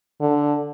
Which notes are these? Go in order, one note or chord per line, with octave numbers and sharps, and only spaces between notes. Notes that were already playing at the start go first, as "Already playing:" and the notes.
D3